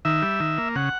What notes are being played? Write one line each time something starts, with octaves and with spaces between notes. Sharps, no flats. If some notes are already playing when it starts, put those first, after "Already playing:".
D#3 E5
G3
D#3
A#3
C#3 F#5